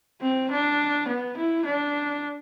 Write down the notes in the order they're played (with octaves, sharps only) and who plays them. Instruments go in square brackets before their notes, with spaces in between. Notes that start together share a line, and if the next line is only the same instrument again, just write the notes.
[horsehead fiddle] C4
D4
B3
E4
D4